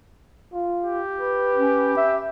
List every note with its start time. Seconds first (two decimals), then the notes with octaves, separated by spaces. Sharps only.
0.53 F4
0.82 G4
1.21 B4
1.55 C#4
1.97 E5